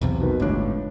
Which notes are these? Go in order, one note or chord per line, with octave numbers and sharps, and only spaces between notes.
B1 E2 C3
B2 D#3 B4
G1 C#2 A2 D4 C#5